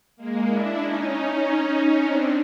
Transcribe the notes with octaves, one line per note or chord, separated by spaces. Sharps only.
G#3 A#3
D4 E4
C#4 D#4
C4 D4